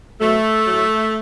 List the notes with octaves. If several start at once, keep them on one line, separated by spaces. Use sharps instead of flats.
B2 F#3 A3
A2 F#3